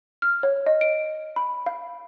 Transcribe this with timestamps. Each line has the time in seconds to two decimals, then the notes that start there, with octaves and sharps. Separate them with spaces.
0.22 F6
0.43 C#5
0.66 D#5
0.81 D7
1.36 B5
1.66 F5